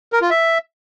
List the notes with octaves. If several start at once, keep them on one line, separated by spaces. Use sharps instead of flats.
A#4
F4
E5